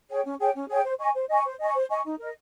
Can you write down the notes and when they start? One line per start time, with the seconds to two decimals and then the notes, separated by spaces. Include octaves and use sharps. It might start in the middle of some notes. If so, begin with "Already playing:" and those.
0.09 G#4 C#5 G5
0.24 C#4
0.39 G#4 C#5 G5
0.54 C#4
0.69 G#4 C#5 G5
0.85 C5
0.99 D#5 G#5 C#6
1.14 C5
1.29 D#5 G#5 C#6
1.45 C5
1.60 D#5 G#5 C#6
1.75 C5
1.90 D#5 G#5 C#6
2.05 D#4
2.20 A#4 D#5